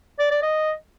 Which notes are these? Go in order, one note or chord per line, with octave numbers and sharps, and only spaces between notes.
D5
D5
D#5